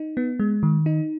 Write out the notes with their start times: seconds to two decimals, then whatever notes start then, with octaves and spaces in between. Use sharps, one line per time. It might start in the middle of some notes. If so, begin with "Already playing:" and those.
Already playing: D#4
0.17 B3
0.39 G#3
0.63 D#3
0.86 D#4